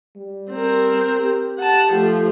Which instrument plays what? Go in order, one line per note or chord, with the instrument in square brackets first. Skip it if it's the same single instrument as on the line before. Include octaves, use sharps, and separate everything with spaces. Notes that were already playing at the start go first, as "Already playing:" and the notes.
[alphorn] G3
[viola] C4 A#4
[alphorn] G4
[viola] F#5 A5
[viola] F3 A3 [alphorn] G4